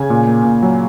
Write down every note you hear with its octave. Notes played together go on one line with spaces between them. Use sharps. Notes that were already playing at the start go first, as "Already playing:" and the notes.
Already playing: C#3 G#5
A#2
A#3
A#2
F#3